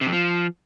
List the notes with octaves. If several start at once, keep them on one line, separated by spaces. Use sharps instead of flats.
C3
F2
F3